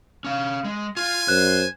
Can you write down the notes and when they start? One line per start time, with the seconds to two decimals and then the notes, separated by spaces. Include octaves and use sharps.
0.24 C#4 F5
0.64 G#3
0.97 F4 G#5
1.28 F#2 C5 F#6